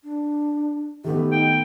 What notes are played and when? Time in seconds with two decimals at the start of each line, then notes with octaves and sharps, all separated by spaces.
0.04 D4
1.04 D#3 A3 B3 G4
1.32 D#4 G5